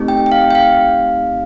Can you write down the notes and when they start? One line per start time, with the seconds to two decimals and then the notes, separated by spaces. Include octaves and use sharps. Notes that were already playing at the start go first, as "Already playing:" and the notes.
Already playing: A3 C4 D#4 G4
0.08 G5
0.26 G5
0.32 F5
0.51 G5
0.55 F5